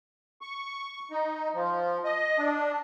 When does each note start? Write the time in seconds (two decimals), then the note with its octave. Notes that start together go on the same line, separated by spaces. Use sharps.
0.41 C#6
1.11 D#4
1.54 F3
2.05 D#5
2.38 D4